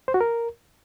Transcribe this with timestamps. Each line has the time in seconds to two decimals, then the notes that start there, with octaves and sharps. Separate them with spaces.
0.08 C5
0.14 F#4
0.21 A#4